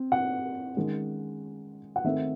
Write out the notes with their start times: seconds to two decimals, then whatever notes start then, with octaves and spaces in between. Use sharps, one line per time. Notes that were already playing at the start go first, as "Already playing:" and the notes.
Already playing: C4
0.12 F#5
0.76 D#3 G#3 C#4
1.96 F#5
2.04 D#3 A3 C4 E5